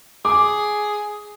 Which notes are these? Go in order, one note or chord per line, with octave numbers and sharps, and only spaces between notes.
G#4 D6